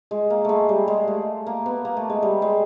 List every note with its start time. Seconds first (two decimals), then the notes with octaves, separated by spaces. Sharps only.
0.11 G#3
0.30 A#3
0.45 G#3 A3
0.69 G3
0.88 G#3
1.08 A3
1.47 A#3
1.66 B3
1.85 A#3
1.97 A3
2.10 G#3
2.23 G3
2.42 G#3